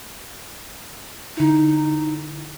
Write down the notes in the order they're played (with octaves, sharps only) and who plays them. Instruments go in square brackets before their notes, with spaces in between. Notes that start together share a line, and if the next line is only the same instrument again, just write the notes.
[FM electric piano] D3 E4 [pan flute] D#4